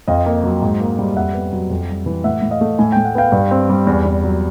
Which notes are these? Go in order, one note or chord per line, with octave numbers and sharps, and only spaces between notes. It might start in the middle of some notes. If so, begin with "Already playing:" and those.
F2 D#5 F5
A#3
F#3
G#2
A#3
G3
F2 E5 F#5
B3
F#3
F2
G3
E3
A2 E5 F#5
A2
D#5 F5
A3
A2 G#5
A2 G5
F#5
B3 F5 G5
G2
C4
G3
E2
E2
F#3